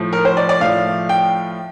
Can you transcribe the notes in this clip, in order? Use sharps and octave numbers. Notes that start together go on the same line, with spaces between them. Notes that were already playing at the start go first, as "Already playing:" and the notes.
Already playing: A2 F3
A#4
C5
D5
D5
A2 F3 F5
G5